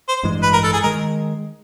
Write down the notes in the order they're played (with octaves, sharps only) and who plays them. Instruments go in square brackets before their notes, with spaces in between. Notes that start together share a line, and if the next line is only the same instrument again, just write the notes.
[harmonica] C5
[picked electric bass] A1 G2 E3 G#3
[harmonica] B4
A#4
A4
G#4
[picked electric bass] D#3 G#3 [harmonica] A#4